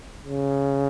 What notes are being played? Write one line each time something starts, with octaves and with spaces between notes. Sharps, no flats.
C#3